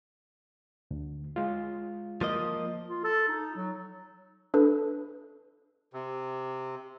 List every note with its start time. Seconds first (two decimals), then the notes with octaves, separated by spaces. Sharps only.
0.91 D2
1.36 G#3 F4
2.21 F3 A#3 D#5
2.88 F4
3.04 A4
3.28 D#4
3.56 F#3
4.54 D4 A4 B4
5.93 C3